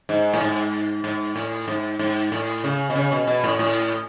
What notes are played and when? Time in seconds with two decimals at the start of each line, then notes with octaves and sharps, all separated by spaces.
0.09 G#2
0.34 A2
0.41 G#2
1.04 G#2
1.36 A2
1.68 G#2
1.99 G#2
2.32 A2
2.64 C#3
2.90 B2
2.95 C#3
3.12 B2
3.27 B2
3.44 A2
3.59 A2